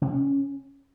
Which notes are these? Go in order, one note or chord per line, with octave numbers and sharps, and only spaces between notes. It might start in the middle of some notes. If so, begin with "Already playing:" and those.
C#3
C3
C#4